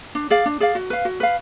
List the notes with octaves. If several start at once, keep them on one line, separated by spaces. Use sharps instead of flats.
D4
G#4 D5 F5
D4
G#4 D5 F5
F#4
B4 F5
F#4
B4 F5